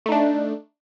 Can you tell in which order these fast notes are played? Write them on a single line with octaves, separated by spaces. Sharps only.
A3 D#4 D4